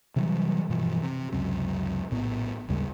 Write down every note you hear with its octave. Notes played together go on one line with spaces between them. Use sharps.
C3 E3 F#3 G3
G2 B2 E3 F3
C3
C#2 F#2 C3
A#1 A2 B3
G#1 D#2 C#3 G3